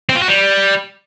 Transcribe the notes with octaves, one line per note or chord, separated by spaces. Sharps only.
C4
F4
F#4
G3